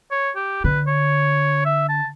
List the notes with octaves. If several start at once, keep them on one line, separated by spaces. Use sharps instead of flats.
C#5
G4
D3 B4
C#5
E5
A5